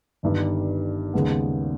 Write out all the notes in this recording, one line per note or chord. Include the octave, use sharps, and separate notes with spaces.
G1 G2 D#3 G3
D#2 C#3 G#3 B3